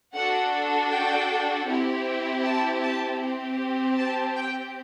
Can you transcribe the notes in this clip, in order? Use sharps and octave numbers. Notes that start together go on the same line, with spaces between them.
D4 F#4 A4 F#5
G5
C4 E4 G4
A5
A5
C4 G4
A5
G5